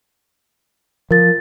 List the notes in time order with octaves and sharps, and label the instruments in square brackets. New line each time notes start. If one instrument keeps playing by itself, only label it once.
[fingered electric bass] F3 [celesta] A#4 A6